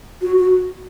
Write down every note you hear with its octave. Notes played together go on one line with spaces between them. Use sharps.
F#4
F#4